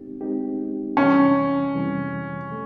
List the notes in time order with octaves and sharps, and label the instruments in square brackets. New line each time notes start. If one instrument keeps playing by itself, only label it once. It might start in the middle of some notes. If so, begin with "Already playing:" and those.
Already playing: [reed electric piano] G#3 C4 D#4 G4
G#3 C4 D#4 G4
[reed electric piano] F2 C3 E3 G3 [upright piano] C#4
[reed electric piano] F2 C3 E3 G3
A3